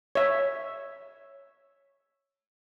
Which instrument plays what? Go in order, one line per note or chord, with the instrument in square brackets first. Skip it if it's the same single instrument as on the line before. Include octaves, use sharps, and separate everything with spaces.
[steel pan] C#5 E5